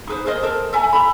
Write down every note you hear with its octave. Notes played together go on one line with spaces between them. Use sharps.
D#4 G#4 B4 C5
G#4 A#4 C5 D#5
A4 A#4 C5
A4 E5 G#5 A#5
E4 A4 B5